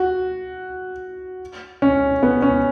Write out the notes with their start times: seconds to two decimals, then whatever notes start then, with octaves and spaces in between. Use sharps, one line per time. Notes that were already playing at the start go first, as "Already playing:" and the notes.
Already playing: F#4
1.82 C#4
2.23 B3
2.42 C#4